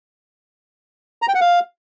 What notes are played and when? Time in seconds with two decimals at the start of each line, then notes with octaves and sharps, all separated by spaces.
1.22 A#5
1.28 G5
1.35 F#5
1.41 F5